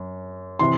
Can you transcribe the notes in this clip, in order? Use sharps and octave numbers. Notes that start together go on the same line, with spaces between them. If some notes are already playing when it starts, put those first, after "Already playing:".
Already playing: F#2
C3 E3 C6